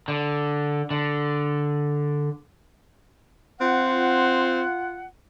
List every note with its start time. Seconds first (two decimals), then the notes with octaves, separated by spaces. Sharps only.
0.08 D3
0.91 D3
3.61 C4 F4 F#5